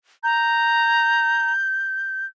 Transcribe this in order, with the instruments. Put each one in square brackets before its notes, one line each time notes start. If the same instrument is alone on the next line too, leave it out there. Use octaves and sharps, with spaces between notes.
[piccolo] A#5 [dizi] G6